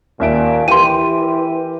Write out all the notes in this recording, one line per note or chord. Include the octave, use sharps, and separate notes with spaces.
D#2 A#2 E5 D7
E3 G4 A#4 G5 C6 D#7